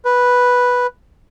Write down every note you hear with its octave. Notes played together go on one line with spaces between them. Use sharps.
B4